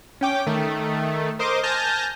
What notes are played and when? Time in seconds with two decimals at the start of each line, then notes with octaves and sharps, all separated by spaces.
0.21 C#4 G5 D6
0.47 D#3 A3
1.39 A#4 C5 D#5 C6 D6
1.63 G#5 A5 F6 G6 A#6